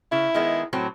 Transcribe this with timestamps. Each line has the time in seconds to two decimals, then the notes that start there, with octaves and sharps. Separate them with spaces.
0.12 C#3 E4
0.34 D#3 G#3 B3
0.73 A2 F#3 C4